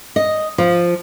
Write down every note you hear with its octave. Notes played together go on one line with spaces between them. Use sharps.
D#5
F3